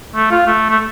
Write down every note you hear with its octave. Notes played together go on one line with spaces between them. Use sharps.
A3
F4
A3
A3